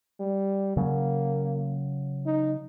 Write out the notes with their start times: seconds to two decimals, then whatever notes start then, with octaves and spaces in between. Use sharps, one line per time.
0.20 G3
0.77 C#3 F#3 A#3
2.26 D#4